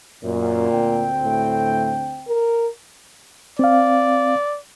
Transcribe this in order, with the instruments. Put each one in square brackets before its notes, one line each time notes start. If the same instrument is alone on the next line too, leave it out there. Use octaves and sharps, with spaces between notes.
[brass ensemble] F#2 [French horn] A#2
[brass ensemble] D2 C4 G5
[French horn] A2
A#4
[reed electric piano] C4 F5 [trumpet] D5